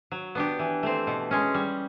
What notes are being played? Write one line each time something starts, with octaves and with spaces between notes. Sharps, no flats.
F#3
B3 D4 G4
E3
A3 C4
B2
G#3 C#4
G3